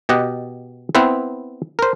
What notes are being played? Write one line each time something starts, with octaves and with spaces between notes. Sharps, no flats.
B2 G4 D#5 F#5
B3 C4 E4 B4 C5
A#4 C5